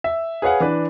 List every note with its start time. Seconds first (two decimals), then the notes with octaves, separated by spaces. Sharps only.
0.04 E5
0.42 G#4 B4 C#5 F5 F#5
0.60 E3 D4 B4